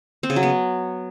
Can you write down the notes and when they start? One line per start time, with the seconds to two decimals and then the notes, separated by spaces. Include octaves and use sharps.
0.23 C4
0.30 C#3
0.36 F#3
0.43 B3